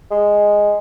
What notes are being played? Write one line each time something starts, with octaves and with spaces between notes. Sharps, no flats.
G#3